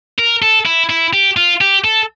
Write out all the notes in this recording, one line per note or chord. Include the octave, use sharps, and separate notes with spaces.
A#4
A4
E4
E4
G4
F4
G4
A4